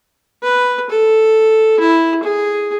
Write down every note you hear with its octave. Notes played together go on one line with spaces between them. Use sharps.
B4
A4
E4
G#4